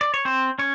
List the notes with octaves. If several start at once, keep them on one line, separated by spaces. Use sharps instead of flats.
D5
C#5
C4 C5
C#4 C#5